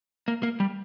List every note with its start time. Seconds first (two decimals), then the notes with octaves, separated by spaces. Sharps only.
0.28 A#3
0.43 A#3
0.60 G3